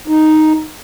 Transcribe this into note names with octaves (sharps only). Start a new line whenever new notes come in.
D#4